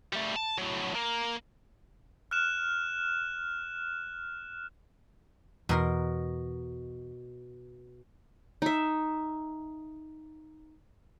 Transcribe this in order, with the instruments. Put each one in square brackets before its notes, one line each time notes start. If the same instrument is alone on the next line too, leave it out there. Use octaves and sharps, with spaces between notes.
[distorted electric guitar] G3 A3
A5
A2 F#3
A#3
[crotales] F6 F#6 E7
[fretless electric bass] E2 [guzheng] B2 A#4 C6
[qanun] D#4 E5